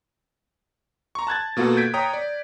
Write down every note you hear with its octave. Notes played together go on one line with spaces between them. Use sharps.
A#5 C6 C#6
A5 F#6 G#6 A6
B2 A#3 F4 F#4 A4
G6 G#6 B6 D7
C#5 G5 A#5 D#6
D5